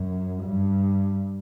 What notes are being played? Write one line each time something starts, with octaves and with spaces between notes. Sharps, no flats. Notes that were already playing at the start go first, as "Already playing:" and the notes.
Already playing: F#2
G2